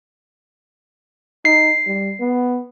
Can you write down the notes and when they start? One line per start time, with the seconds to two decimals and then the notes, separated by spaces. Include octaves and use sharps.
1.45 D#4 C7
1.87 G3
2.20 B3